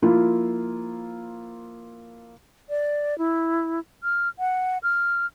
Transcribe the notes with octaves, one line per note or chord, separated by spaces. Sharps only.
F3 A#3 E4 F4
D5
E4
F6
F#5
F6